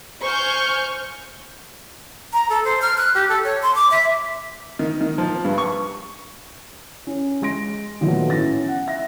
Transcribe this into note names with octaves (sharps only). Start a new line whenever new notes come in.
C5 G#5 C#6 F6 G6
A#5
A4
C5
F6
F#6
G4
A4
C#5
C6
D6
E5
D#3
D#3
F3
G2
C#6
C#4
G#3 C6 A#6 D7
A#2 D#3 F3 F#3 A3 B3
A2 C#4 A6 A#6
F#5
E5 A#6